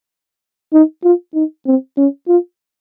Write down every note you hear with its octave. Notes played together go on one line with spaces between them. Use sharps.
D#4
F4
D#4
C4
C#4
F4